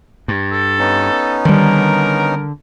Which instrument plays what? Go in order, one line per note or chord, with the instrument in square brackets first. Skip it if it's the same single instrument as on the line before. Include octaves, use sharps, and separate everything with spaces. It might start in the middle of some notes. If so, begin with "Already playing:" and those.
[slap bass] G2
[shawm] A4
[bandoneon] B3 C#4 D#4
[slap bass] D3 [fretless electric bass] D#3 G3 [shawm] A#4